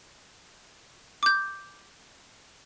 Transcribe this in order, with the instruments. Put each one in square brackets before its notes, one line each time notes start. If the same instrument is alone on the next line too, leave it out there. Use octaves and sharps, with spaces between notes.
[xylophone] D6 G6